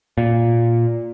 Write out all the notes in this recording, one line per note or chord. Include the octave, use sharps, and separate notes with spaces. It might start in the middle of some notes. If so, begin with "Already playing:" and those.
A#2